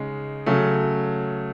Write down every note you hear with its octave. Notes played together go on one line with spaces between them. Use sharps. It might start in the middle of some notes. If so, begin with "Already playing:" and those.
Already playing: C#3 G#3 D#4
C#3 F#3 A3